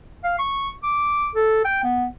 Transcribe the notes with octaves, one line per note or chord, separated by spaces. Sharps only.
F5
C#6
D6
A4
G5
B3